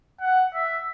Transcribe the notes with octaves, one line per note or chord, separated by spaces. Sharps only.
F#5
E5